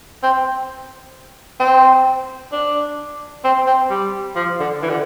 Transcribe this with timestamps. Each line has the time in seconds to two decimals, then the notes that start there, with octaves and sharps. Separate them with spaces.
0.23 C4
1.60 C4
2.52 D4
3.44 C4
3.66 C4
3.90 G3
4.36 F3
4.59 D3
4.82 E3
4.89 D3